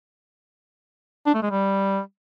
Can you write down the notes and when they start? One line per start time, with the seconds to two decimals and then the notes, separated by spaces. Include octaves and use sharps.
1.26 D4
1.34 A3
1.42 G#3
1.50 G3